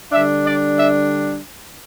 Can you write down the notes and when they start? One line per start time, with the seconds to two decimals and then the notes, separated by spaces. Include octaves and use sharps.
0.12 D3 G3 D4 E5
0.45 D5
0.77 E5